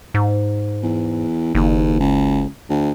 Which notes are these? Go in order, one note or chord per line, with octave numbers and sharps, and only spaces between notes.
G#2
E2
F#1 D#2
C#2
D2